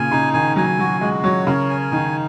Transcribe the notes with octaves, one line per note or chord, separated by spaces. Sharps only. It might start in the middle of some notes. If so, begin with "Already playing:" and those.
Already playing: A#2 C#3 G#5
C#3 D#4
D#3 G#5
F#3 G#5
F#3 F#4
G#3 F#4
F#3 C#5
C#3 A#4
G#5
D#3 D#4